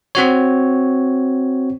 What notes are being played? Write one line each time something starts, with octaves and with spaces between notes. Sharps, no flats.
C4 F#4 C#5